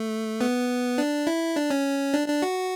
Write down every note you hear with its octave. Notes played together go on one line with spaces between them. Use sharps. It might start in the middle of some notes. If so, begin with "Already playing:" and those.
Already playing: A3
B3
D4
E4
D4
C#4
D4
D4
F#4